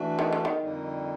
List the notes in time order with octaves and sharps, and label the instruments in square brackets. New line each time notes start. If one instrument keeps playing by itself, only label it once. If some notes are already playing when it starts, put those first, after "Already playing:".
Already playing: [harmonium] E3 A3 D4 F#4
[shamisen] D#3
D3
D#3
[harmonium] F2 D3 G3 A#3 D#4